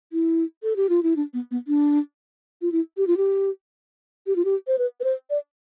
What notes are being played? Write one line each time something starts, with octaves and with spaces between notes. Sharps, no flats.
E4
A4
G4
F4
E4
D4
B3
B3
D4
F4
E4
G4
F4
G4
G4
F4
G4
C5
B4
B4
C5
D5